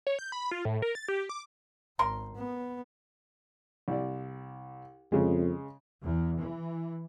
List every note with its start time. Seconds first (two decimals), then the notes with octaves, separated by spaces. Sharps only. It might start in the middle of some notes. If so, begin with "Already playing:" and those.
0.07 C#5
0.19 G6
0.32 B5
0.51 F4
0.65 A2
0.82 A#4
0.95 A6
1.08 G4
1.29 D6
1.99 G#1 C#4 A#4 C6
2.35 B3
3.88 C2 D5
5.12 F2 C#3 G#3
6.03 E2
6.39 E3